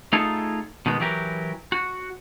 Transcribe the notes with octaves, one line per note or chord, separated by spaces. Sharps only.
A3 D#4 F4 G#4 A4
B2 D#3 G#3 B3
E3 F#3 G4 A#4 B4
F#4